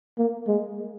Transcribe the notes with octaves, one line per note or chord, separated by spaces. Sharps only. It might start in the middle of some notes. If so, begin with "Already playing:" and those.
A#3
G#3